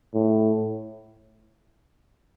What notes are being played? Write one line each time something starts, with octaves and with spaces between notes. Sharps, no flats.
A2